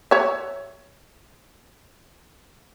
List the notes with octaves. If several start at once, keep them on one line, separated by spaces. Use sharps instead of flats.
C#5 E5